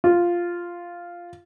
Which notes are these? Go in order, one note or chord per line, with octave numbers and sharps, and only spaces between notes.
F4